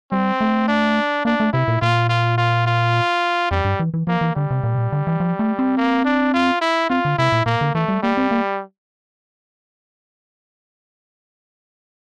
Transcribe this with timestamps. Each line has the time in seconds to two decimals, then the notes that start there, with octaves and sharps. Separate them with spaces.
0.11 G3 C4
0.41 A3
0.68 D4
1.25 A#3 D4
1.40 A3
1.53 C3 E4
1.68 A#2
1.81 A#2 F4
2.09 F4
2.37 F4
2.67 F4
3.51 F2 G3
3.65 G2
3.80 E3
3.94 E3
4.07 F3 A#3
4.21 E3
4.35 D3 G3
4.51 C3
4.64 A#2
4.75 C3
4.78 A#2
4.92 D3
5.07 E3
5.20 F3
5.39 A3
5.59 C4
5.77 A#3
6.05 D4
6.34 F4
6.61 E4
6.90 C4 F4
7.05 D3
7.18 C3 E4
7.32 A#2
7.46 A#2 A#3
7.61 D3
7.75 E3 A3
7.88 G3
8.03 G3 A#3
8.17 C4
8.31 A#3